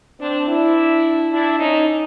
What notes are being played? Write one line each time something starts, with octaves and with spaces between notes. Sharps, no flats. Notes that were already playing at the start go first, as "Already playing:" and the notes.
C4 D4
D4 E4
D4 E4
C#4 D#4